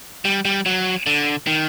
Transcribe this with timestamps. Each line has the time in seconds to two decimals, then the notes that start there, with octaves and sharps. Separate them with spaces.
0.25 G3
0.45 G3
0.66 F#3
1.06 D3
1.47 D#3